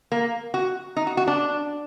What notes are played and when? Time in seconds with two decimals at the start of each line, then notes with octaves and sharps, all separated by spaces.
0.12 A#3
0.54 F#4
0.96 D#4
1.07 F#4
1.17 F#4
1.27 D4